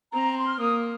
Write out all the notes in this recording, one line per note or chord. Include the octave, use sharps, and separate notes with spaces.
C4 A#5
C6
F6
A#3 D#6